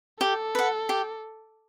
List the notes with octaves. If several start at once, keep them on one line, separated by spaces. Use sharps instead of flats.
G4 A4
B4 F#5
G4